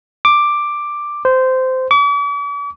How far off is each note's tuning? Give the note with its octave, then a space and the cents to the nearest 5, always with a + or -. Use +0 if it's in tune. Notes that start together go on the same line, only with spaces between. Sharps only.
D6 +5
C5 -15
D6 -45